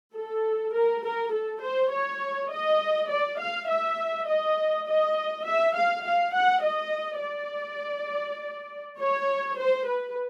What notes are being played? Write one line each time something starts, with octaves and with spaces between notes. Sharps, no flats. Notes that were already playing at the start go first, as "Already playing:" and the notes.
A4
A#4
A#4
A4
C5
C#5
D#5
D5
F5
E5
D#5
D#5
E5
F5
F5
F#5
D#5
D5
C#5
C5
B4